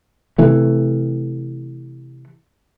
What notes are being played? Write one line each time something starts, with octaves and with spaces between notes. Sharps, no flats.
C3 E3 A3